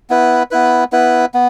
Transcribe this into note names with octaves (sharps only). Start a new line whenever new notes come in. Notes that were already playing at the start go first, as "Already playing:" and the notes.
B3 E4 B4
B3 E4 B4
B3 E4 B4
B3